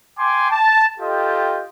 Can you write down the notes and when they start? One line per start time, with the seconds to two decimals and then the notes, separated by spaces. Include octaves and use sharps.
0.18 G5 G#5 C6 D6
0.51 A5
0.99 F4 G4 A4 D#5 G5